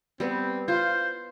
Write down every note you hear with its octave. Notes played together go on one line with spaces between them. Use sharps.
G3 B3 C4
F4 C5